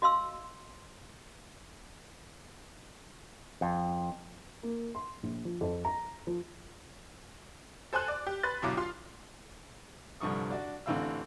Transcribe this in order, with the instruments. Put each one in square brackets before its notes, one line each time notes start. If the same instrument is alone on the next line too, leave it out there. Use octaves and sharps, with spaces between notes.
[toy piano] F#4 D#5 F5 C6 E6
[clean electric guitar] F2
[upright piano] A#3
C6
A#1
F3
F2
A#5
F3
[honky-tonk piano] A4 C5 G#5 C6 F#6
D5
G4
B4 C6 F#6 A6
G1 B2 F#3 E4 F5 D6
F4 F5 C6
[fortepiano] C2 G2 D3 F3 C#6 D#6
D4 F#4 D5
A1 D3 E3 C4 F5 E6